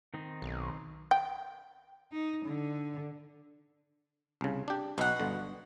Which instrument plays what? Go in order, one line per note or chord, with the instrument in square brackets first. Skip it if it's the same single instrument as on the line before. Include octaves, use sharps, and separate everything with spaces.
[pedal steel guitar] D#3 C4 D#4
[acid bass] B1
[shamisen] G5
[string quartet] D#4
D3
[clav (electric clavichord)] C2 C#3
D4 G4
[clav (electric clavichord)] B1 [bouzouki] B2 F#5
[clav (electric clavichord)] G1 D3